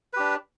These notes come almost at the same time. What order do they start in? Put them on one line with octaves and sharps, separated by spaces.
B4 G4 D4